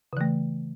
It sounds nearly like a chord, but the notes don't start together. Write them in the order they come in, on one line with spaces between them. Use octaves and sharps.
C#3 E3 A3